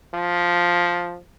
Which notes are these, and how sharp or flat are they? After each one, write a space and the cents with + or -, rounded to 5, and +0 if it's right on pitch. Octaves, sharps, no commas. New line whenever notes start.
F3 +5